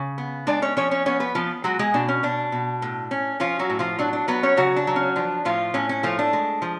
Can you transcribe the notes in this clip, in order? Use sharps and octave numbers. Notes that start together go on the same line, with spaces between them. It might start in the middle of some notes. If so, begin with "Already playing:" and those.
Already playing: C#3
B3
G#3 D4 D5
C#4 C#5
F3 C#4 C#5
C#4 C#5
B3 C#4 C#5
B3 B4
F3 B3 F4
F#3 G#3 F#4
G#3 G#4
B2 D4
C#4
B2 D4
B2
A2
C#4
F3 C#4 F4
F#3 F#4
A2
F3 F4
F#3 D4
D4
F#3 B3 B4
C#4 C#5
C#3 F#3 F#4
D4
F#3
C#4
F3 D4
A2 F3 F4
A2 C#4
C#4
F3 A3 F4
D4
G#3
F3